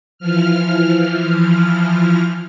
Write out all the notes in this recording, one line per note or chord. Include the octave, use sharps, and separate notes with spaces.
E3 F3 F6